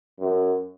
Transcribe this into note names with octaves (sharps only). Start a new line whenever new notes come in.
F#2